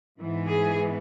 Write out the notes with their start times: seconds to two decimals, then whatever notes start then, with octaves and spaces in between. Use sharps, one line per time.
0.18 G#2 E3 B3
0.47 G#4